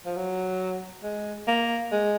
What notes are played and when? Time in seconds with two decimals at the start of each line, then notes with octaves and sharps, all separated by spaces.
0.05 F3
0.16 F#3
1.03 G#3
1.47 A#3
1.92 G#3